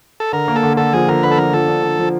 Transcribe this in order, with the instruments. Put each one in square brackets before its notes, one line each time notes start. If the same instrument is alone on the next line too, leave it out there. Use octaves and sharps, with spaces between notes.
[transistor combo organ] A4
[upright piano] D3 [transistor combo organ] A#4
[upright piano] A#3
[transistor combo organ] A4
[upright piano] D3
[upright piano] D3 [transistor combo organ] A4
[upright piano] F3 [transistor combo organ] G#4
[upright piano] D3 [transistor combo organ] A#4
[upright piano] D3 [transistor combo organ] B4
[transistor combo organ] A4
[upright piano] F3 [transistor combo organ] A#4
[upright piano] F3 [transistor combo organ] A4
[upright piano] D3
D3
F3